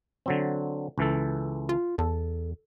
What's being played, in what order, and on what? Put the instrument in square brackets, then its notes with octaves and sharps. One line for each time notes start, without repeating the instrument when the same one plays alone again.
[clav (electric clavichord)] D3 F#3 C4
C#2 E3 A4
[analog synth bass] F4
[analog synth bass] E2 [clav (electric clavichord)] A4